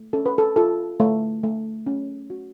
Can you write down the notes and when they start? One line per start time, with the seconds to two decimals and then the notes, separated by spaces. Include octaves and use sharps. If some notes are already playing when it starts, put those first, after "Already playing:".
Already playing: A3
0.13 C#4 A4
0.26 B4
0.38 A4
0.56 F4 A4
1.00 A3
1.43 A3
1.87 C#4
2.30 F#4